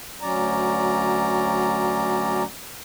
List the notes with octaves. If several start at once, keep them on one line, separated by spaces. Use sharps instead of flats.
D2 F#3 C#4 D5 A#5